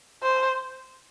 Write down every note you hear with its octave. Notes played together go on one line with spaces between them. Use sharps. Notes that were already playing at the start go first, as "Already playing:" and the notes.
C5